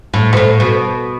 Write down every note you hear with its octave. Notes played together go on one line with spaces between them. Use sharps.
A2
B2
A2
B2